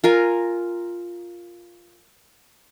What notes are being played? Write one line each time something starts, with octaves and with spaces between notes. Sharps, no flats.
F4 A#4 G#5